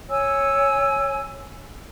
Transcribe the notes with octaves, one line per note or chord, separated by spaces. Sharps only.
C#5 G#5 E6